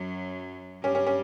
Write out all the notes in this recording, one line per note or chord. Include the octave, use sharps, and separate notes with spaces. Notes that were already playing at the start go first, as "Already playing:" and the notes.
Already playing: F#2 F#3
G2 G3 C#4
C#4
C#4